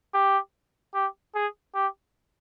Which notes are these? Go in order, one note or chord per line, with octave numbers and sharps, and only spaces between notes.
G4
G4
G#4
G4